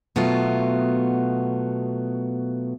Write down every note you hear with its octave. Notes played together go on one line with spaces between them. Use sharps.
B2 F#3 A3 B3 F4